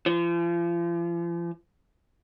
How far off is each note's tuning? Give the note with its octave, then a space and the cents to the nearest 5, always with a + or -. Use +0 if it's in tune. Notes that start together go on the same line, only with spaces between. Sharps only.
F3 -40